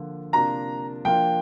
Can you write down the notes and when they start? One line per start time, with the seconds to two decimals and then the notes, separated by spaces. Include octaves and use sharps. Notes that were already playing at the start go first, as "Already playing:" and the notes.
Already playing: D3 F3 A#3 D4 F4
0.33 C3 A#3 D4 F4 A#5
1.05 F3 A#3 D4 F4 G5